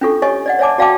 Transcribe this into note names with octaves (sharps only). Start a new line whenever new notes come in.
C#4 D4 F4 A4 C#6
G4 C#5 D#5 G#5 C#6
D5 D#5 F#5
C#5 D5 E5 G#5 A5 D6
F#4 D5 F5 G5 A5 D6